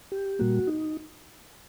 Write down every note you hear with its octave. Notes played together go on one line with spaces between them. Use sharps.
G4
A#2 G3 A#3 F#4
D#4